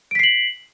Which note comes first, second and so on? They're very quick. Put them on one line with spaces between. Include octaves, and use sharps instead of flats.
D7 B6 C7 F#7